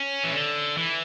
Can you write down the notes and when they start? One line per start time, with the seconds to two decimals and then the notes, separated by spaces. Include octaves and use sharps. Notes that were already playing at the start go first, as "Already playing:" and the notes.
Already playing: C#4
0.24 E3
0.33 D3
0.77 E3